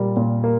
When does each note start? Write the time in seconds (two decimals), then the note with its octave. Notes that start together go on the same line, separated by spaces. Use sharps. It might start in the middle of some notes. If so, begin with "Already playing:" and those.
Already playing: A#2 G3 A#3
0.17 A#2
0.44 A#3